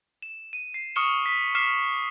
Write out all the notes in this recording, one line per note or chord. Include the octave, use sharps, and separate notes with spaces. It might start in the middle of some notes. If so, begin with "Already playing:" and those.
E7
D#7
C7
C#6 D#6 F6 C#7 E7 G7
B6
D6 F6 B6 C7 E7